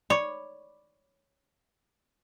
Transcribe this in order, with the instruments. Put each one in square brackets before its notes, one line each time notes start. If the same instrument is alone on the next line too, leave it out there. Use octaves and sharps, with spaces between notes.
[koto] C#5 [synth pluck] D5 B5 D6